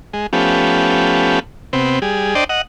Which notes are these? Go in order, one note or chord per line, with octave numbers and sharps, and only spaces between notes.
G#3
F3 A3 B3 C#4 G4
C3 B3 C4
G3 G#4
D4 C5 D5 D#5 G5
D#5 F#5